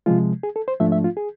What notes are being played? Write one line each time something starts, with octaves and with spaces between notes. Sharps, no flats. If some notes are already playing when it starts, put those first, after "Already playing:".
C3 F3 G#3 F4
G#4
A4
C5
G#2 F3 A3 D4 E5
E5
F4
G#4